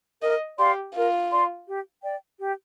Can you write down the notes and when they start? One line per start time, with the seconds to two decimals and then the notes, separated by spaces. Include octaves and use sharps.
0.22 A#4 D#5
0.58 G4 D5 F5 C6
0.95 F4 A#4
1.30 D5 F5 C6
1.67 G4
2.04 D5 G5
2.40 G4